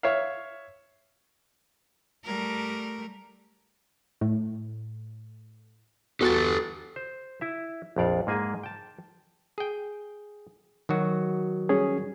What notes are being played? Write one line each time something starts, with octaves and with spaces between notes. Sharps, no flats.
C#5 E5 F5
G3 A3 A#4
A2
E2 F#4 G4 A4 A6
C5
E4 E5
A#1 F2 D5 F5
G#2 A#3 G#4 G#5
G5 A5
G#4 G5
D#3 F#3 F#4
G3 C#4 G#4